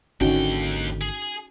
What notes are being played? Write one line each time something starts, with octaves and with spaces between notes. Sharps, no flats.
G#1 D#2 D3 C#4 D#4 F#4 G5
G#4